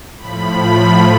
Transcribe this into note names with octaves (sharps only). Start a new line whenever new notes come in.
A2 F3 B5